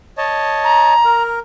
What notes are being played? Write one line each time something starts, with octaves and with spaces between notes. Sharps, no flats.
C#5 D#5 A5
A#5
A#4